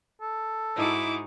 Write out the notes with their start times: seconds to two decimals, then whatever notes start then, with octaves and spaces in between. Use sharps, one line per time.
0.21 A4
0.76 G#2 D#4 E4 F#4 D6